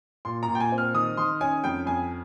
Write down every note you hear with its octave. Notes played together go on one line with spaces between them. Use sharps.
A#2 C6
A#5
A#2
G5
G#5
C4
F6
D#3 D#6
D#3 C6
C#4 G#5
F2 G5
F2 G#5